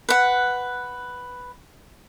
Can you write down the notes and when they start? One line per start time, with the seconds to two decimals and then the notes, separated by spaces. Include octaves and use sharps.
0.09 B4 F#5